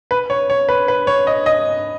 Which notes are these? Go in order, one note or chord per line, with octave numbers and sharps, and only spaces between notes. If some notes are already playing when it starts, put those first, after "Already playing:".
B4
C#5
C#5
B4
B4
C#5
D#5
D#5